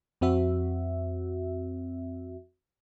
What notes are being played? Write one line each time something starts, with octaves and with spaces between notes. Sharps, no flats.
F2 C4 F#4 E5